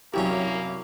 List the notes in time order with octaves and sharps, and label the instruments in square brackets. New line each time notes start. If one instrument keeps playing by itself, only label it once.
[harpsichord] C2 F#2 C#4 [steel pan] F#3 E4 G4 [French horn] A#3